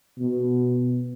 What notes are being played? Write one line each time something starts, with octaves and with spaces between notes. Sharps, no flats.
B2